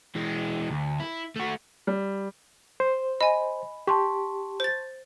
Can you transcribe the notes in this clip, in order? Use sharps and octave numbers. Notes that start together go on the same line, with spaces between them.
E3 G#3
D2
E4
A3 F#4
G3
C5
D#5 G#5 B5
G4 A5 C6 C#6
C5 A6